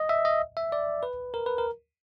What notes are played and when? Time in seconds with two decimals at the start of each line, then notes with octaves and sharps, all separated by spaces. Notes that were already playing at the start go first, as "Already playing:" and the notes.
Already playing: D#5
0.09 E5
0.25 D#5
0.57 E5
0.72 D5
1.03 B4
1.34 A#4
1.46 B4
1.58 A#4